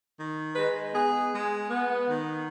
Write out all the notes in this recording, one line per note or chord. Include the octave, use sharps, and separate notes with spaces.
D#3
G#3 B4
B3 G#4
G#3
B3
D#3